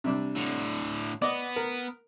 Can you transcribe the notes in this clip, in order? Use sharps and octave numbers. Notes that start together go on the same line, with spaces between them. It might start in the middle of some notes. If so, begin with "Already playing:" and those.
C3 G3 D4
A2 D3
B3 D5 D#5
A#4